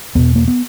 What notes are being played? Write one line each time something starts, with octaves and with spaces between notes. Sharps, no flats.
E2 B2 B3
A#3
B3